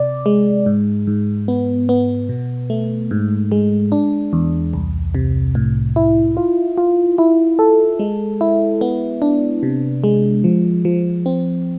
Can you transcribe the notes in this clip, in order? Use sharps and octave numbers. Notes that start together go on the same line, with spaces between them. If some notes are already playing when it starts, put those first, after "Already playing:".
Already playing: C3 D5
G#3
G#2
G#2
B3
B3
B2
A3
G#2
G#3
D4
E2
C2
C3
A2
E4
F4
F4
E4
A4
G#3
E4
B3
D4
C3
G#3
F3
F3
C4